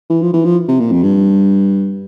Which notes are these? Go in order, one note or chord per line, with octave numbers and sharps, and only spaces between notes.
E3
F3
E3
F3
C3
A#2
F2
G2